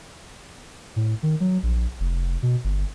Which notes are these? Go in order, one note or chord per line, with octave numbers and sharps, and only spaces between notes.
A2
D#3
F#3
A#1
F1
B2
G1